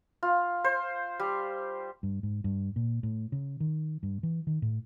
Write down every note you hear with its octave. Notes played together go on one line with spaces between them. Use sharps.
F4
C5
G3
G2
G#2
G2
A#2
A2
C#3
D#3
G2
E3
D#3
A2